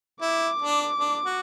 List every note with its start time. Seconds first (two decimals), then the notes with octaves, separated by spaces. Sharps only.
0.22 E4 D6
0.62 D4
1.00 D4
1.26 F#4